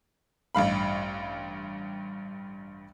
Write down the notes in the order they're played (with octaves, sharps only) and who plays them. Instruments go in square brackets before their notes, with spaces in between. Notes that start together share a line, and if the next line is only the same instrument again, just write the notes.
[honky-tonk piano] A1 G2 F5 B5